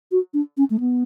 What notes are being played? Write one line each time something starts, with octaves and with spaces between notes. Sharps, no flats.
F#4
D4
C#4
A3
B3